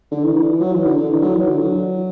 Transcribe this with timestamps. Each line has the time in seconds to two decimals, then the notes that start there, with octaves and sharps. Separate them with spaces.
0.11 D3
0.24 E3
0.36 E3
0.49 E3
0.61 F#3
0.73 E3
0.86 D3
0.97 D3
1.10 E3
1.22 F#3
1.35 E3
1.47 D3
1.59 F#3